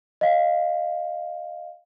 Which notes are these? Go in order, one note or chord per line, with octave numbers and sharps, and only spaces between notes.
D#5 F5